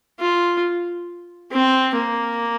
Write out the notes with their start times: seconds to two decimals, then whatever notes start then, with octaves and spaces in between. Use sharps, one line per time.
0.19 F4
1.52 C4
1.96 A#3